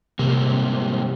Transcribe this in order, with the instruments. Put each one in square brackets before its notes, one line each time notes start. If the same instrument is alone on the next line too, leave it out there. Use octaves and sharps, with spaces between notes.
[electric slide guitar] G#2 G3 A#3 [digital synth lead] C3